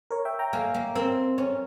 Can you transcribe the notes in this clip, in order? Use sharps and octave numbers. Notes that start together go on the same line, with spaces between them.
A#4 C#5
E5 G5
G5 A#5
A#3 F5 G#5
A#3
C4 A#4
C#4